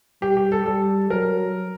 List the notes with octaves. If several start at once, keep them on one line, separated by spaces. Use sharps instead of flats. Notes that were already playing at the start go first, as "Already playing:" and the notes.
G3 G4
G4
A4
G3 A4
F#3 A#4